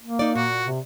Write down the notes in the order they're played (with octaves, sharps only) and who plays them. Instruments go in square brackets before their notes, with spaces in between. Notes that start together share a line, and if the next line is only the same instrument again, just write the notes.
[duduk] A#3
[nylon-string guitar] D#4 D5
[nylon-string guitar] A#2 [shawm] F#4
[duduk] C3